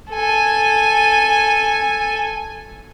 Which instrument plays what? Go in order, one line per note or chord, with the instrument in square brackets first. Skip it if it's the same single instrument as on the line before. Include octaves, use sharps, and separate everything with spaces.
[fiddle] A4 G#5